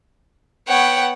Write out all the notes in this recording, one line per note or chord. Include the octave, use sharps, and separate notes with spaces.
B3 C#5 F#5 G5